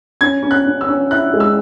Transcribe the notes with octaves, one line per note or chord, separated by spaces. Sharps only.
C#4 G#6
C#4
F#6
C#4
E6
C#4
E4 F#6
G#3
E6